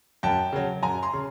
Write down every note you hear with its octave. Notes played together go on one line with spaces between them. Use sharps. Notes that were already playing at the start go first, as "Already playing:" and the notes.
F#2 G5 A5
C#3 F#3
F#2 G#5 A#5
A#5 C6
C#3